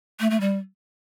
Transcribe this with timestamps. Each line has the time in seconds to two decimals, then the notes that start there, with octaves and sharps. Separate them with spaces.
0.20 A3
0.30 A3
0.41 G3